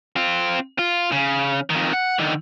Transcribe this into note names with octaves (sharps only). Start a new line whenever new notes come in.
C4 F4
F4
C#3
F2 D#3
F#5
D3 D#3